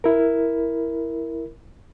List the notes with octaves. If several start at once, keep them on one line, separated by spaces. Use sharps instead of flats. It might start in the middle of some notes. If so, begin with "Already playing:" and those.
E4 A#4